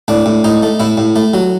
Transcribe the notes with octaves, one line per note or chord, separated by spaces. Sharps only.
A2 D4
A2
A2 D#4
A3
A2 E4
A2
A3
F#3